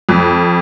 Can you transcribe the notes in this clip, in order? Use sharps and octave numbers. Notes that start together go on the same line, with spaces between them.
F2